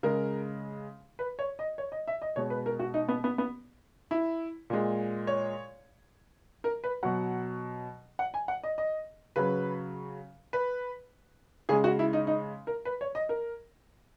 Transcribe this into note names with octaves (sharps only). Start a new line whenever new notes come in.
C#3 G#3 A#4
B4
C#5
D#5
C#5
D#5
E5
D#5
B2 G#3 C#5
B4
A#4
F#4
D#4
B3
B3
B3
E4
A#2 G#3
C#5
A#4
B4
B2 F#3 F#5
F#5
G#5
F#5
D#5
D#5
C#3 F#3 B4
B4
C#3 G#3 G#4
F#4
E4
D#4
D#4
A#4
B4
C#5
D#5
A#4